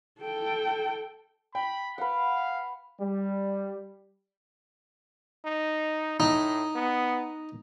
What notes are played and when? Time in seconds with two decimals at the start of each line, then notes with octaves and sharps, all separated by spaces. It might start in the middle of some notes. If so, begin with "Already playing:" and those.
0.21 A4 G5
1.55 G5 B5
1.98 B4 F5 F#5
3.00 G3
5.45 D#4
6.20 A2 D#4
6.75 B3